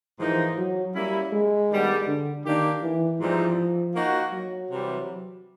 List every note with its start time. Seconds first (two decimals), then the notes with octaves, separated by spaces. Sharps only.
0.20 G#2 E3 F3 A#3 D#4
0.57 F#3
0.95 G3 A#3 C#4 E4
1.33 G#3
1.70 G2 D#3 G3 B3
2.07 D3
2.45 D#3 A#3 D4 G4
2.82 E3
3.20 G#2 E3 F3 G3 C4 D#4
3.96 A#3 D#4 F#4
4.33 F#3
4.71 C3 E3 G3